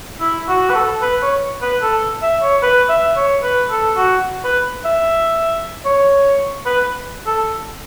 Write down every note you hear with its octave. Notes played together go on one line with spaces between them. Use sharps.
E4
F#4
B4
A4
B4
C#5
B4
A4
E5
C#5
B4
E5
C#5
B4
A4
F#4
B4
E5
C#5
B4
A4